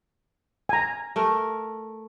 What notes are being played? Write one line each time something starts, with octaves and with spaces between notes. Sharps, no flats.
G#5 A#5
A3 A#4